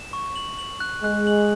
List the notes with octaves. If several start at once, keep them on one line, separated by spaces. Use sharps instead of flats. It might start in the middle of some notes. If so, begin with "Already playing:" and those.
Already playing: E7
C#6
F#7
F#7
F#6
G#3 F#6
F#7